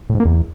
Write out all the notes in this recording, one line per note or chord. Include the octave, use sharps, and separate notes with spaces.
A2
G#2
A#3
E2